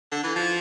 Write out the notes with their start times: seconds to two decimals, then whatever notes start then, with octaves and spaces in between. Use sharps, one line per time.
0.11 D3
0.23 E3
0.36 F3